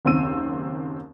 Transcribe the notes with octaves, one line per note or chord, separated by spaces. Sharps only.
F#1 D#2 C4 E6 D#7